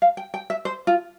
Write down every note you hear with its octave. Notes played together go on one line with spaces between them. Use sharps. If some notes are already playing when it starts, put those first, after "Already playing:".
F5
G5
G5
E5
C5
F4